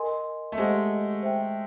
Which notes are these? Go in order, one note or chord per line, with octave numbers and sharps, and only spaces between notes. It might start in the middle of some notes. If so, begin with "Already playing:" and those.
Already playing: A#4 D#5 G#5 C6
A3
G#3 G4 C5 D#5 F#5
C5 E5 G5